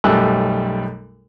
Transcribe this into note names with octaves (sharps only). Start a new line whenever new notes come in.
B1 F#2 G3 A3 E6 F#6